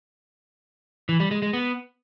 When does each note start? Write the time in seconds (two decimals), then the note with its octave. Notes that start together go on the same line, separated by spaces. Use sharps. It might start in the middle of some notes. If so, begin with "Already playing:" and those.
1.09 E3
1.20 G3
1.31 G#3
1.42 G#3
1.53 B3